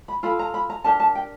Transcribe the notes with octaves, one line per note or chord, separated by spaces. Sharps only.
B5
F4 A4 B5
A#5
B5
A#5
D4 G4 A#4 A5
A5
G5